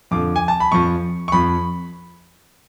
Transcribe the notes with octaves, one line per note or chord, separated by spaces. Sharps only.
F2 D3 F3 D6
G#5
A5
B5
F2 F3 C#6
C#6
F2 F3 B5